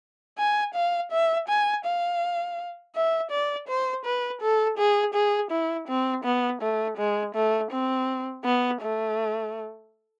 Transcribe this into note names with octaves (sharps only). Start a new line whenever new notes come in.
G#5
F5
E5
G#5
F5
E5
D5
C5
B4
A4
G#4
G#4
E4
C4
B3
A3
G#3
A3
C4
B3
A3